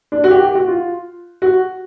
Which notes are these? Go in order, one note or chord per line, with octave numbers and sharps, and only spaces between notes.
D4
F#4
G4
G4
F#4
F4
F#4